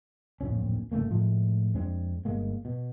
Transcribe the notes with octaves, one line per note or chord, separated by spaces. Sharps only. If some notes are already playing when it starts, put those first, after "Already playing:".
D1 A#1 F2 C#4
G1 C#3 A3 A#3
A2 F3 G#3 A3
F2 G#3 C4 D4
G1 G#3 A#3
B2